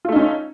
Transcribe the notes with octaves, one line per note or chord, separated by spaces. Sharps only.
A3 C#4 D#4 F4